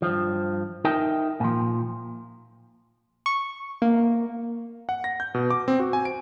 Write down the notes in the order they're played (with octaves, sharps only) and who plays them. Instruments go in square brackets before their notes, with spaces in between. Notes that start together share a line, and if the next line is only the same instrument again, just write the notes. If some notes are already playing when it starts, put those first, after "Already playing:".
[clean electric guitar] G2 F3
D#4 A#4 E5 G5
A#2 F3
[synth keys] C#6
A#3
[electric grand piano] F#5
A#6
G6
B2
D6
C4
F#4
G#5
D7